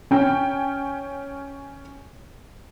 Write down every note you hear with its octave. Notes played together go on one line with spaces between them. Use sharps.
C#4 G5